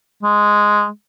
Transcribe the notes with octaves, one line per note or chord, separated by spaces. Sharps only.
G#3